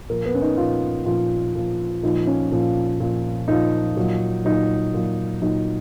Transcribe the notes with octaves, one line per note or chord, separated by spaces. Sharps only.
A#2 F3 A#4
B3
C#4
D#4
A#2 F3 F4
A#2 F3 F4
A#2 F3
A#2 F3 D#4
C#4
A#2 F3
A#2 F3
A#2 F3 D#4
A#2 F#3
A#2 F#3 D#4
A#2 F#3
A#2 F#3 D#4